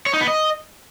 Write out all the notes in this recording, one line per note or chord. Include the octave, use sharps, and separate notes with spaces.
C#5
D#4
B3
D#5